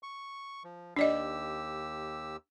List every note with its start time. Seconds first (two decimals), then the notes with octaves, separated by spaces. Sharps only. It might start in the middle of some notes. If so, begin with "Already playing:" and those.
0.03 C#6
0.64 F3
0.97 D#2 D4 G4 D5 D#5 E6